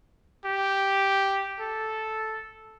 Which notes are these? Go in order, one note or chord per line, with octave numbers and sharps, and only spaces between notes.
G4
A4